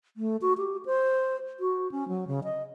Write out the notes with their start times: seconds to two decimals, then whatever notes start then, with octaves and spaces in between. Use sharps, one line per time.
0.17 A3
0.42 F#4
0.58 G4
0.86 C5
1.60 F#4
1.92 C#4
2.08 F#3
2.27 C#3
2.44 D#5